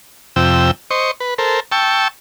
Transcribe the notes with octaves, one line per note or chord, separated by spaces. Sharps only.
F2 C3 G5 E6
C5 D#5 C#6
B4
A4 A#4 C5
G5 A5 C#6 E6